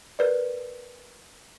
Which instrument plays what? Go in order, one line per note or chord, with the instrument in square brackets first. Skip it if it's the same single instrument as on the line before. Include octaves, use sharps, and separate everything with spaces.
[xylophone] A#4 B4 D5